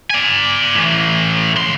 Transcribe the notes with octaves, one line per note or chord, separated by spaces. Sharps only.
D5 G#5
A2 E3
C#2 C6